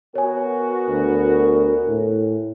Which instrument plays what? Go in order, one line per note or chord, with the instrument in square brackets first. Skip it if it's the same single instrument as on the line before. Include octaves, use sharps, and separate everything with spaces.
[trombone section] B3 F#4 [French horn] A#4 [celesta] C#5 G#5
[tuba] D2
A2